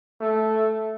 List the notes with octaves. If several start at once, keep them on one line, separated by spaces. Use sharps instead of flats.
A3